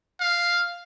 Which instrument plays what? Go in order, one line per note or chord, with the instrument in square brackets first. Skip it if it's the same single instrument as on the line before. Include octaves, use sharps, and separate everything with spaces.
[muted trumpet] F5